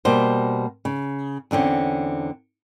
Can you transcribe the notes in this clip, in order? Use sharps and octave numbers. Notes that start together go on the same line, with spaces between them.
B2 G3 A#3 C5
C#3
E2 D3 C4 C#4